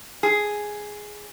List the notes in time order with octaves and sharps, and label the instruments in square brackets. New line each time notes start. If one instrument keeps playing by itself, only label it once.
[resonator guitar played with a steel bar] G#4